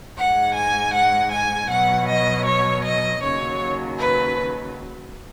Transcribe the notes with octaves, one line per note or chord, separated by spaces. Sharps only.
G#2 G#3 F#5
G#5
F#5
G#5
B2 F#3 F#5
D#5
C#5
D#5
D#2 C#3 F#3 C#5
B4